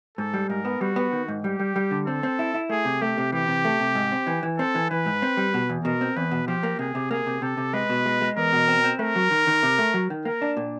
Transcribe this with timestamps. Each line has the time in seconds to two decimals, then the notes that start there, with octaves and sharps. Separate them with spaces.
0.17 G#2 A4
0.34 G3
0.49 G#2 A#4
0.65 B3
0.81 G3 F#4
0.96 B3
1.12 D#3
1.28 G#2
1.43 G3 G4
1.60 G3
1.76 G3
1.91 D3
2.06 C4 A4
2.23 C4
2.39 E4
2.54 E4
2.69 A3 G#4
2.85 C3
3.02 A3 G4
3.18 C3
3.32 E3 G4
3.48 C3
3.65 A3
3.80 C3
3.95 G#2
4.12 C4
4.27 E3
4.43 E3
4.58 C4 A4
4.75 E3
4.90 E3 B4
5.06 G#2
5.22 C4
5.37 G3
5.54 B2
5.69 E2
5.85 B2 A#4
6.01 C4
6.16 E2 B4
6.31 B2
6.47 F3 G4
6.63 A#3
6.79 C3 G#4
6.95 C3
7.11 A#3 G#4
7.26 C3
7.42 C3 A4
7.57 C3
7.74 G#3 B4
7.89 B2
8.06 G#3
8.21 G#3
8.37 E2 A#4
8.53 B2
8.68 C4
8.84 C4
8.99 A3 A#4
9.16 F#3
9.31 D#3
9.47 D#3
9.63 C3
9.79 A3
9.94 F#3
10.10 D#3
10.25 A#3 A#4
10.42 D4
10.57 A#2